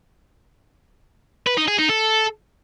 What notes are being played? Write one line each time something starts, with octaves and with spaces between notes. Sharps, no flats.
B4
D#4
G#4
D#4
A4